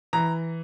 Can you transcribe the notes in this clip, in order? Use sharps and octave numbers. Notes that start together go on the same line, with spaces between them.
E3 A#5